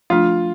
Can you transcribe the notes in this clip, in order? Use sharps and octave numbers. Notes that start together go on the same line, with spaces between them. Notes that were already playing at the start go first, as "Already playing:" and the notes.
F3 A3 D4 F4